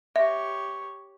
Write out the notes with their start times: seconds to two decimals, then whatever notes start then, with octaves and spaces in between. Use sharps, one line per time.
0.16 G4 C#5 E5